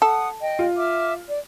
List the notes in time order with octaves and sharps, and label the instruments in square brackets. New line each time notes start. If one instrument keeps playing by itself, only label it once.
[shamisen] A4 [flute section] F#5 D#6
[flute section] D#5 G5
[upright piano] F4
[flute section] E5 D6 F6
D5